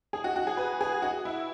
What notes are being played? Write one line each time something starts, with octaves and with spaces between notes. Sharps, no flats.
G#4
F#4
F#4
G#4
B4
G#4
F#4
E4